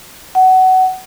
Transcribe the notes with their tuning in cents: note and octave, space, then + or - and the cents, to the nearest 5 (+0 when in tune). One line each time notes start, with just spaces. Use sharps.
F#5 +20